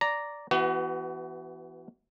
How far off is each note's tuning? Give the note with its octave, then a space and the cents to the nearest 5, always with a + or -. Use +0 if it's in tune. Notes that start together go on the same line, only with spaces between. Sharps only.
D5 -10 A#5 +0
E3 +20 B3 +0 F#4 +35